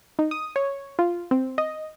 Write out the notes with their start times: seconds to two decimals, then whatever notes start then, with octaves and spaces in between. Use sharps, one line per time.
0.19 D#4
0.31 D#6
0.56 C#5
0.99 F4
1.31 C4
1.58 D#5